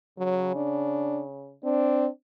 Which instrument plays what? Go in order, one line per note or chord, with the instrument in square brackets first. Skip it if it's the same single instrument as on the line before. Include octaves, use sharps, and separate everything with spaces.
[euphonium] C#3 [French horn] F#3
[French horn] D4
[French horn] C4 [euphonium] D4